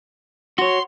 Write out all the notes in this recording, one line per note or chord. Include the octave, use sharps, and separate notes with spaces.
F#4 C#5 C6